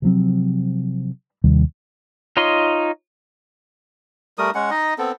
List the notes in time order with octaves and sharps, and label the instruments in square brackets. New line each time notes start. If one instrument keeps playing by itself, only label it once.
[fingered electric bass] C3 F3 F#3 C4
D#2 C3 D#3 G3
[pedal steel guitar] D#4 F4 C#5 D#5 C6
[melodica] G3 A3 A#4 D#6
G#3 C#4 F#5
D#4 D#5
B3 C4 A4